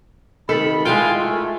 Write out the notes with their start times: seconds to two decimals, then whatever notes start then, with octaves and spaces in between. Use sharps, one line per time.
0.49 C3 D#3 A4 B5
0.86 G#3 E4 F4 F5 G5 G#5
1.19 A3